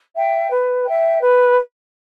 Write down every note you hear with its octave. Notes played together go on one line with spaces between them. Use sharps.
E5 G5
B4
E5 G5
B4